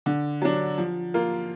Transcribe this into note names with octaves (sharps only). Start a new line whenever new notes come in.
D3
F#3 D4
F3
A#3 F4